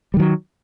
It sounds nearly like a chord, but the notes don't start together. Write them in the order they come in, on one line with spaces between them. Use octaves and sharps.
G3 D#3 F#3